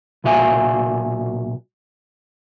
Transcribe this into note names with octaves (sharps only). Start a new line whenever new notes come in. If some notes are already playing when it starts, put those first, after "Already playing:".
B1 A#2 F#4 E5 F5 G#5